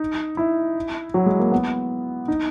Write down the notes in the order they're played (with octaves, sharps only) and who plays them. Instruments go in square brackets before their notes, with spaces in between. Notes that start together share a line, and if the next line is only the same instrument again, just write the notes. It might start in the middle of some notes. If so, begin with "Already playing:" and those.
Already playing: [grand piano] D#4
E4
F#3
G#3
A#3
B3
D#4